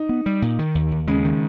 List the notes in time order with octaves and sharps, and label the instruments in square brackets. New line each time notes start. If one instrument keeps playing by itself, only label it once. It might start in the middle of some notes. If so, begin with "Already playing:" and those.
Already playing: [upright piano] D#4
[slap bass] B3
G3
A#2
D#3
D#2
D#2
[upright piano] C#3 [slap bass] G#3
[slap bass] D#3